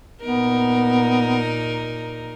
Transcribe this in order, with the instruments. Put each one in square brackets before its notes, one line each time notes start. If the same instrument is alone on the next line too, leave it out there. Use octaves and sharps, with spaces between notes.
[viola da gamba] A#2 D#4 A#4 [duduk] B3